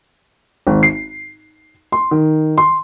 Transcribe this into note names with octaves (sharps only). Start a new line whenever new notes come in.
G#1
C7
C6
D#3
C6